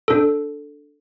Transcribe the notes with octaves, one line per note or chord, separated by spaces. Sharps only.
D4 A4